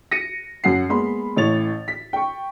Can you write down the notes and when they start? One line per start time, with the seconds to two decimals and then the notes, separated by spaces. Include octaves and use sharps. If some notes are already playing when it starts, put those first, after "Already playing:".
0.11 A#6 C#7 D#7
0.64 F#2 F#5 C7
0.89 G#3 A#3 B3 B5 C6
1.36 A1 A2 C#5 A6 F7
1.88 B6
2.13 G5 C#6